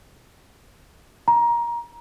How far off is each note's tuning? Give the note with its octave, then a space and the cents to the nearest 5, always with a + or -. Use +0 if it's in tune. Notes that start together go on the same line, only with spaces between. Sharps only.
A#5 +20